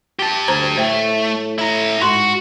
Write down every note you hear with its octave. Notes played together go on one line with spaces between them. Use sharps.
G4 A5
D2 C5 A#5
A2 A3 C5 G5
E4 A#5
G#2 F#4 C6